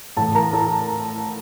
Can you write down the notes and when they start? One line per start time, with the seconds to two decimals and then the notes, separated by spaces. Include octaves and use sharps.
0.17 A2 E3 A3 A4 A5
0.35 A#4 A#5
0.53 A4 A5